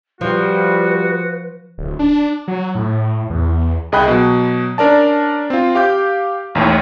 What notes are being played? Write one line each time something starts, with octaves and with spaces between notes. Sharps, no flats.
F3 G3 F#4 B4
D1
D4
F#3
A2
E2
C2 G#4 D#5 G5 B5 F#6
B2 F#3
C#4 D4 A#4 D5 A5
C4 F4
G4 F5 D6 G6
A1 D#2 A2